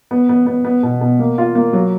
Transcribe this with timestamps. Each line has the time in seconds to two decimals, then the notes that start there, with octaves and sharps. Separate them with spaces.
0.11 B3
0.29 B3
0.46 B3
0.65 B3
0.83 B2
1.01 B2
1.19 A#3
1.38 F4
1.55 A#3
1.73 F#3